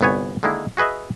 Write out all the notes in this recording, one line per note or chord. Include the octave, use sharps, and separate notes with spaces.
G1 C2 B3 C#5 G#5
D3 D#3 G#3 A#3 E4
F#4 G#4 B4 D#5 E5